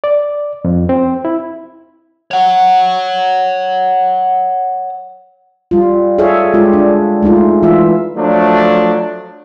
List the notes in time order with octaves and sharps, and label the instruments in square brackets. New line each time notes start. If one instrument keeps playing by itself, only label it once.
[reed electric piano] D5
F2
C4
E4
[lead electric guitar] C#5 F#5
[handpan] G3 F4
G#4 A4 C#5 E5 F5
G#3 F4 G4
D4
G#3 A3 D#4 F4
E3 F4 E5
[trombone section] F3 F#3 A3 D4